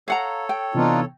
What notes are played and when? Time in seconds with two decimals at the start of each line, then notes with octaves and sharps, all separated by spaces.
0.08 A4 C#5 F5 F#5 A#5
0.49 G5
0.75 C3 E3 B3 D4 D#4 F4